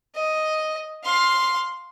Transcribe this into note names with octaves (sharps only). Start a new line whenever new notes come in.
D#5
F5 C6